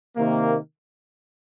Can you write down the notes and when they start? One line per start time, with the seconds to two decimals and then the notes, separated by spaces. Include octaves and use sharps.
0.16 C3 D#3 A#3